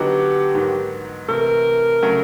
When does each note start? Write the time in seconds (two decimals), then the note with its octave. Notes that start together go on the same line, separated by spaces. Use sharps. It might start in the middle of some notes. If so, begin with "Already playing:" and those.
Already playing: D3 F#3 B3 D#4 F#4 G4
0.55 G#2 D#3 F#3 B3
1.28 C3 E3 A3 A#4
2.03 C#3 F#3 A3 C#4